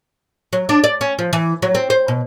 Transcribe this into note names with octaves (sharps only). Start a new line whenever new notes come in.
F#3
D4
D5
C#4
F3
E3
F#3
C4
C5
B2